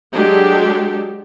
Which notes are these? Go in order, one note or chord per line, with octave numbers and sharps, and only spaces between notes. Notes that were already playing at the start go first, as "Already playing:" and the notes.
F#3 G#3 D4 G4 A4